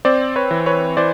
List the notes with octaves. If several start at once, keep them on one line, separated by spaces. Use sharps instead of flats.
C4 C5 D5
B4 C#5
E3
B4 C#5
E3 C5 D5